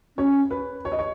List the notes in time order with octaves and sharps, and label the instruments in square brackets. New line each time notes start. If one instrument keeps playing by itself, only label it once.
[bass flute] C#4 [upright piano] C#5
[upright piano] B4
C#5
D#5
C#5